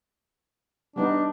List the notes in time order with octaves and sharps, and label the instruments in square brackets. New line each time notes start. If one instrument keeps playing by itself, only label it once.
[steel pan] G3 B3 D#4 [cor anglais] D4